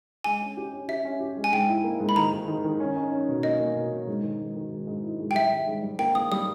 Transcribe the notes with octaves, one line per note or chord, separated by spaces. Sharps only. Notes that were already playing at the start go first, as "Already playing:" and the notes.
G#3 G#5
C#4
G4
C#4
G4 E5
C#4
G4
G#3
G#5
G#2 G5
E4
A#3
G#2
B5
D#3 A#5
D#3
D#3
D#3
C#4
C#4
C#4
B2
A#3 D#5
A#3
B2
B2
G#2
D#3
G#2
D#3
G#2
G#2
E4
G#2
G5
G3 E5
D#3
G#2
G3
A#3 G5
A#3 D#6
G3 D#6